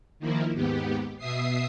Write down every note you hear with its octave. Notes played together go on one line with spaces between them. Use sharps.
D#3 F3 A#3 E4
D#2 G#2 B3 G4
B2 E5 D#6 C7